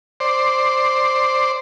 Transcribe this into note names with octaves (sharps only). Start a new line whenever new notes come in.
C5 D5